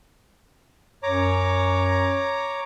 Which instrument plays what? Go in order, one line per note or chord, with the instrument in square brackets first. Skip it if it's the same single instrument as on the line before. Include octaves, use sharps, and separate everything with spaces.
[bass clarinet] F#2 [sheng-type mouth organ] C#5 A#5 D6